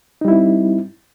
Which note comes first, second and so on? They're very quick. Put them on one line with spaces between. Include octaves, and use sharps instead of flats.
D#4 G3 E4 C4